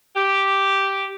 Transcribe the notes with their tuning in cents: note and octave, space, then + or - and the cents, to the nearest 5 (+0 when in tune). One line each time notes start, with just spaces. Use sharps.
G4 -5